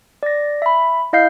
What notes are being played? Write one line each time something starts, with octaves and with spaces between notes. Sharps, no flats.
D5 A#6
E5 B5
E4 D#5 F5 G6 C7